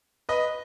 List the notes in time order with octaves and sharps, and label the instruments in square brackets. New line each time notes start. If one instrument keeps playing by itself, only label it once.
[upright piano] B4 D#5